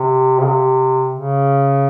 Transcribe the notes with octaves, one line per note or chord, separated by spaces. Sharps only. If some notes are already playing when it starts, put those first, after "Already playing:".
Already playing: C3
C#3
C3
C#3